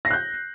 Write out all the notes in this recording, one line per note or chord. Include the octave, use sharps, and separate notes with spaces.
F#6 G6 A#6 C7